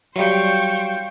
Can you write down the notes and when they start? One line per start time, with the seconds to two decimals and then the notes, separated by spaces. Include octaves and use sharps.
0.16 F#3 G3 C5 F5 G5 C#6